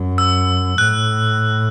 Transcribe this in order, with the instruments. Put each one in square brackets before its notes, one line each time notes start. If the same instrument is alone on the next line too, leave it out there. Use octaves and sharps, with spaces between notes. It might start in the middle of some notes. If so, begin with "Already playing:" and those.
Already playing: [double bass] F#2
[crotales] E6
[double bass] A2 [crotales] F#6